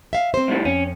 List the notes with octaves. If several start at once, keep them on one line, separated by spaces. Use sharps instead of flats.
E5 F5
C4 C5
C2 A2 G3
F2 C#4